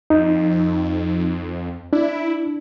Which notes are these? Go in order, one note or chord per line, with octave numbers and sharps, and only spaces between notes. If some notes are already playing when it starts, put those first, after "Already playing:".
F2 D#4
D4 E4